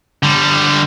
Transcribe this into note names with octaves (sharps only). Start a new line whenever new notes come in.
D3 G3